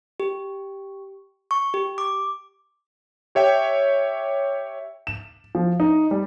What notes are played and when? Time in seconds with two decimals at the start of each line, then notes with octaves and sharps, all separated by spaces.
0.20 G4
1.51 C#6
1.74 G4
1.98 D6
3.35 G4 C#5 E5 G5
5.07 E7
5.55 F3
5.80 D#4
6.11 G3